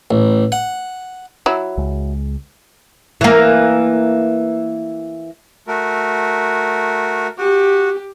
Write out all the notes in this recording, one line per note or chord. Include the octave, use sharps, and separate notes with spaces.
A1
F#5
F#3 E4
C#2 G#3
E3 A#3
A3 F#4 A#4
F#4 G4